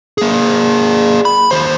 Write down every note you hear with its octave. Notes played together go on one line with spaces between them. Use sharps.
A#3 G#4
B5
D#2 C5